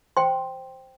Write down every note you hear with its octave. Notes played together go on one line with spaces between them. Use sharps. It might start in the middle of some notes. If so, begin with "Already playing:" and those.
C5 G5 C6